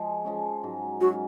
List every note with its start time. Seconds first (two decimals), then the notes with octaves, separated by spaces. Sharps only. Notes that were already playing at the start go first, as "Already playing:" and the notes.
Already playing: F3 G#3 G#4
0.25 F3 G#3 C#4
0.63 G#2 F#3 C#4
1.00 G#2 F#3 C#4 F#4